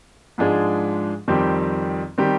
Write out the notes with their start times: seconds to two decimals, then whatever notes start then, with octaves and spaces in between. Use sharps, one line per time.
0.38 G#2 F3 G#3 D4 G#4
1.28 F2 D#3 G3 C4 G4
2.18 D#3 G3 C4 G4